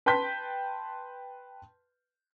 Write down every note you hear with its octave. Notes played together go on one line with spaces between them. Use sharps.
B4 G5 A5 C6 G6 B6